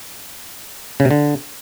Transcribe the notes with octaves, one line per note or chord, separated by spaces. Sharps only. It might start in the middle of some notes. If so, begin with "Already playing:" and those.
C#3
C3
D3